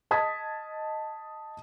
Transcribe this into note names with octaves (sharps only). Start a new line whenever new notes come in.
D#5 A5 D#6 G#6 B6